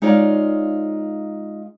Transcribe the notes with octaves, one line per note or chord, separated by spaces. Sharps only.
G#3 D#4 F4 C#5 D5 F5